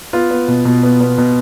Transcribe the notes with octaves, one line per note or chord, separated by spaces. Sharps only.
B3 F4
B3
B2
B2
B3
B3
B2